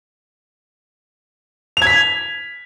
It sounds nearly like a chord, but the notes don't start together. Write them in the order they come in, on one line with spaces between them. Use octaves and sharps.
F7 G#6 B6